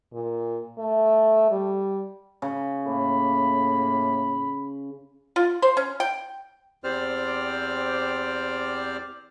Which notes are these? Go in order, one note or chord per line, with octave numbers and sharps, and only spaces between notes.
A#2
A3
G3
C#3
A2 A#3 B5
F4
C5
C#4
G5
E2 C4 G4 C5 D5 F6